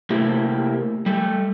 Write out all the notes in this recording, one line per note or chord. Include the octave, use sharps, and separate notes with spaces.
C3 A3 A#3 E4 G4
G3 A3